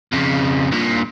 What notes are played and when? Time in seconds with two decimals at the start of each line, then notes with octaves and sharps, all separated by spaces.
0.12 F2 C#3
0.71 G2 A#2